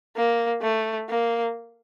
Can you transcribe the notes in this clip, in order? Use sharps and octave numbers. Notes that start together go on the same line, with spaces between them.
A#3
A3
A#3